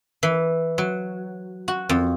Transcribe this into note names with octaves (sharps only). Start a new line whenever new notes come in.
E3
F#3
F#4
F2